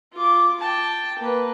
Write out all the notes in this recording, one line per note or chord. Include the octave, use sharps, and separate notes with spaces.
F4 D6
G5 A5
A#3 B4